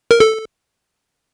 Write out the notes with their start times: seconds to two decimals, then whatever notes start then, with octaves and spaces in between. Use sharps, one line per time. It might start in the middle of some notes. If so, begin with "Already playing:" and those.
0.11 A#4
0.20 A4